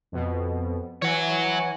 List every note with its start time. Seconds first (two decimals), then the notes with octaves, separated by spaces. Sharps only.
0.12 F2 B2
1.02 E3 C#5 F#5 G#5